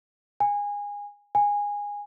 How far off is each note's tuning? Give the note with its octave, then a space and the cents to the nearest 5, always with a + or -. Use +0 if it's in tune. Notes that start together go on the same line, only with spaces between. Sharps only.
G#5 -25
G#5 -20